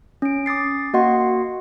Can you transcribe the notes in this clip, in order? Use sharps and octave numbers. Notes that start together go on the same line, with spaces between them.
C#4 D7
D6 D#6 A6 C7
A#3 F#4 D#5 F#5 C6